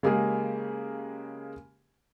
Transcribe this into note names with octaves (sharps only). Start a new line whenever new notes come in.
C#3 G#3 A#3 G4 G#4